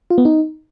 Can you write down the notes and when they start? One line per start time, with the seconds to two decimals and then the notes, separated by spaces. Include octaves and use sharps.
0.10 F4
0.18 B3
0.25 D#4